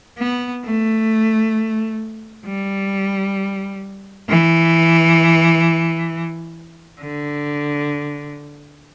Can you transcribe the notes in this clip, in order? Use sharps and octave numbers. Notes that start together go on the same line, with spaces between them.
B3
A3
G3
E3
D3